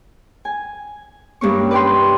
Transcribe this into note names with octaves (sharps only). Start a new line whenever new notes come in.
G#5
G2 A#3 C#4 C#6
B4 D5 G5 C6